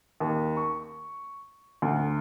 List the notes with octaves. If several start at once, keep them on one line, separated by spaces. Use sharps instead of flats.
D#2
C#6
D2